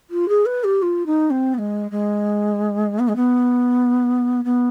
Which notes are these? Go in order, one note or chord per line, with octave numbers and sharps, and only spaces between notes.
F4
G#4
B4
G4
F4
D#4
C4
B3
G#3
G#3
B3
G#3
B3
B3